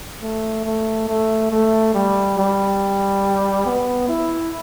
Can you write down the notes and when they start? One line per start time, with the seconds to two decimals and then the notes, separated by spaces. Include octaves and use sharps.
0.22 A3
0.65 A3
1.08 A3
1.51 A3
1.94 G3
2.37 G3
3.66 B3
4.08 E4